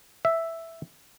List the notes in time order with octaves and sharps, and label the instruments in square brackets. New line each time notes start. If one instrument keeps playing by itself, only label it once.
[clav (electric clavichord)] E5